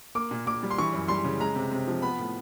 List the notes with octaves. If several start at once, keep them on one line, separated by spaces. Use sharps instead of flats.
A#3 D6
A#2
A#2 D6
G3
C6
E3 C#6
F#2
G3 C6
C#3
G#3 A#5
C3
C3
F3
B3 B5
A2